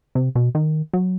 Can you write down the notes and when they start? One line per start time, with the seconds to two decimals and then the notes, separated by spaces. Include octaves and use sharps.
0.15 C3
0.35 B2
0.55 D#3
0.93 F#3